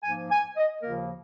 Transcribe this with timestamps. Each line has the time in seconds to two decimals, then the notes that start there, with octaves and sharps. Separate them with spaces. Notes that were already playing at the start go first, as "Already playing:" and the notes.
0.03 G#2 F3 A#3 G#5
0.30 G#5
0.57 D#5
0.83 D#2 C#3 F3 A#3 F4 A#4